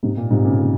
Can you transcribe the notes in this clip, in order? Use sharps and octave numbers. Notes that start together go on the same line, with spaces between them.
G#2 C3
A#2
G#2 C3
A#2 C#3
A#2 C#3